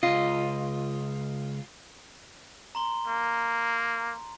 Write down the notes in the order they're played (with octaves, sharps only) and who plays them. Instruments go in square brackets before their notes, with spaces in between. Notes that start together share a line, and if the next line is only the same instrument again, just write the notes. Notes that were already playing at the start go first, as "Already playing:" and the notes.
[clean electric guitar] C#2 D#5 [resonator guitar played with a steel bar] F4
[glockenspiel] A#5 C6 G7
[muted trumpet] A#3